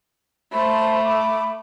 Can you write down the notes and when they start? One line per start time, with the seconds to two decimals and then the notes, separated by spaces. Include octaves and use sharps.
0.52 A3 C5 A5 B5
1.03 D6